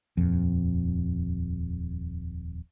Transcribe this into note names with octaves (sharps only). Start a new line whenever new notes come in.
D#1 F2